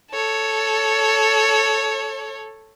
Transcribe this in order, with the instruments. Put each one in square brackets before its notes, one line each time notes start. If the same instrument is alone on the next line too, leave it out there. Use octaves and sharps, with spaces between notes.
[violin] A4 C#5